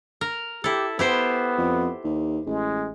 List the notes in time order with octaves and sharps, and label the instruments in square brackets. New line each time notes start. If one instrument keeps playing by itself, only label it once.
[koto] A#4
[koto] E4 A4 [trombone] G4
[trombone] B3 [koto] E4 G4 C5
[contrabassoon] F2
D#2
[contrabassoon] A1 [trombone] G#3